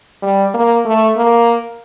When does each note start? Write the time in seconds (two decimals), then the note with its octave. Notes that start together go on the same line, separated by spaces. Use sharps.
0.22 G3
0.54 A#3
0.85 A3
1.17 A#3